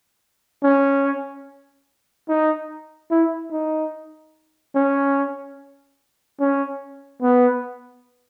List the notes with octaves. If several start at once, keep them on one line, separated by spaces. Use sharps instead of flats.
C#4
D#4
E4
D#4
C#4
C#4
B3